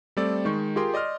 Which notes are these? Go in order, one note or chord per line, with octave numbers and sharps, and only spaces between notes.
G3 A3 C4 A4 D5
D#3 G#3 C#6 G6
F4 G4 G#4 A#4 G5 C6
D5 D#5 C6 F6